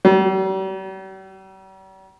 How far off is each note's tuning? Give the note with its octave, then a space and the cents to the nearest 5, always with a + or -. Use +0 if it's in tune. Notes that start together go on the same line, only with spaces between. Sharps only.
G3 -45